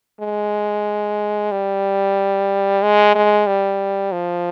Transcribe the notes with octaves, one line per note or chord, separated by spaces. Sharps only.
G#3
G3
G#3
G#3
G3
F3